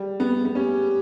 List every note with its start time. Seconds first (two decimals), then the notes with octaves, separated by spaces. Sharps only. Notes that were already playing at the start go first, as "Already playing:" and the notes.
Already playing: G3
0.20 B3
0.45 B3
0.54 C#4 G4